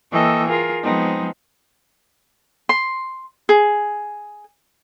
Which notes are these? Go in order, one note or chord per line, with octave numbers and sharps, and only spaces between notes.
E3 A#3 A4 D#5 G5 C#6
F4 G#4 A#4
F3 G#3 B3 C4 D#4
C6
G#4